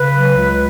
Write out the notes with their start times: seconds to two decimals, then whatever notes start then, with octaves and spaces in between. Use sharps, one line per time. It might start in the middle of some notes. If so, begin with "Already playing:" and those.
Already playing: C#3 B4
0.14 F#3
0.36 C#2